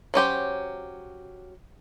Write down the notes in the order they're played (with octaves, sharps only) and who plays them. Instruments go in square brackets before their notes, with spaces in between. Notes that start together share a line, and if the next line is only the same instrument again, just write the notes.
[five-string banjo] F#3 C#4 G4 C5